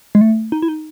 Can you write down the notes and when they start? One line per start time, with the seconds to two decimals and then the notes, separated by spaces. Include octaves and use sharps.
0.15 G#3
0.21 A3
0.52 D#4
0.62 E4
0.68 D#4